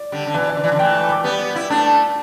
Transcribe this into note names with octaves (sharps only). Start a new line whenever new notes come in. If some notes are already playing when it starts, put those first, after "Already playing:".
Already playing: D5
D3 G3
D3
B2 E3 D5
D5
D3
E3 D5
D3
E3 A3 G5
B5
D6
G3 B3
E4
A3 D4